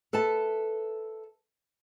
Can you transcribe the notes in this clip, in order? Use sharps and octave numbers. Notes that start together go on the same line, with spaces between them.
A4 B4 E5 A5